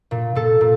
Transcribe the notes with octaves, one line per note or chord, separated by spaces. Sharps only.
A#2
A#2 A4
A#2